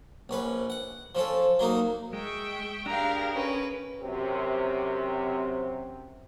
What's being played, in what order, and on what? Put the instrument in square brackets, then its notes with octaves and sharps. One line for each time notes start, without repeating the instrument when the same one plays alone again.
[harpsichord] A#1 C#4 B4
F#5
F3 C#4 A4
F#3 A#3 D#4
[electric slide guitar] G#3 [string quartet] E5 G5 C#6
[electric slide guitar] D4 G4 [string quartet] G#4 A#4 [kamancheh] F5 G5 [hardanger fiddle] A#5
[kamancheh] C#4 [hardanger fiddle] B4
[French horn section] F#2 C3